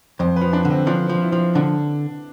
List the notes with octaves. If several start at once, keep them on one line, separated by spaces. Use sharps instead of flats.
F2 C5
B4
F3
D4
D3
C4
F3 D4
F3
E4
F3
D3 D4